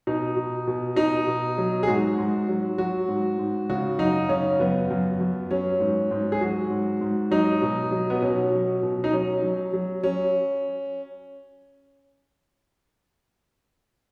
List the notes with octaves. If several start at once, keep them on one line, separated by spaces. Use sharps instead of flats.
B2 D#4
B2
B2
B2 D#4
B2
F#3
G#4
G#2 F#4
G#2
F#3
F#3 F#4
G#2
G#2
C#3 F#4
F#2 D#4
C#3 C#4
F#2 B3
F#2
F#2
F#3 C#4
G#2
G#2
G#4
F#3 F#4
G#2
G#2
F#3 D#4
B2
F#3
B3
B2 C#4
F#3
B2
D#4
F#3 C#4
F#3
F#3
F#3 C#4